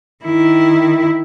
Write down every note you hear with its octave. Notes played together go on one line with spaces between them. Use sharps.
D#3 E4